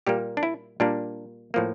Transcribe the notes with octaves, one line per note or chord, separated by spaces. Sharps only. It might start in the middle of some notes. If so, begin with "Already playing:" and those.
A#2 G3 A#3 G4
D4
E4
A#2 G3 A#3 D4
A2 F3 A#3